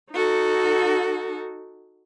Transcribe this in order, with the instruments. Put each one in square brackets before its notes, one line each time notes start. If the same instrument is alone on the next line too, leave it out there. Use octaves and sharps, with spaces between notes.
[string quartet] D#4 F#4 A4